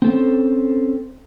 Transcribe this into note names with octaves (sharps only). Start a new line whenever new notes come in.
C4 C#4 A4 C5